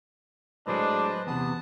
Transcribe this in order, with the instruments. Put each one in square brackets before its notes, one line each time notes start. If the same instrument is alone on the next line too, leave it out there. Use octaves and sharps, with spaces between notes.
[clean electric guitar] A2 F#3 G#3 [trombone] D4 [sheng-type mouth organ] B4 C5 D#5
[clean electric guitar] E2 C3 [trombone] B3 [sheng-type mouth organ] A5 D#6